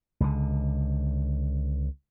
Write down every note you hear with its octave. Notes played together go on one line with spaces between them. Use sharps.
C#2 D3